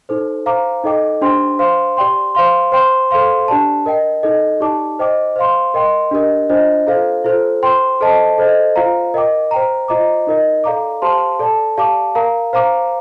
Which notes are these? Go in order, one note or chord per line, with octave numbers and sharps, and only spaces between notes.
D#4 A4 C5
C5 F5 A#5 D6
D#4 A4 D#5 G5 D6
D4 G4 C5 G5 C6
C5 F5 C6
G4 D5 G5 C6
C5 F5 C6
C5 G5 C6
A4 C5 F5 C6
D4 G4 D5 A5
A#4 D#5 G5
D#4 A4 D#5
D#4 G4 D5 A5 D6
C5 D#5 G5 D6
C5 F5 C6
A#4 D#5 G5 C6
D4 G4 A#4 D#5
D4 F4 C5 D#5
F4 A4 C5 F5
F4 A4 C5
C5 G5 C6
A4 C5 D#5 A5
A4 C5 D#5
F4 C5 F5 A#5
A#4 D#5 G5 D6
C5 G5 A#5
F4 C5 D#5 A#5 D6
D#4 A#4 D#5
A4 D5 F5 A#5 D6
G4 C5 F5 A5 C6
A4 D5 A5
G4 D5 F5 A5 D6
A#4 F5 A#5
C5 F5 A#5 D6